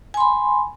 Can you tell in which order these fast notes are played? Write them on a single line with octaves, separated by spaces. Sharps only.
G#5 C6 B5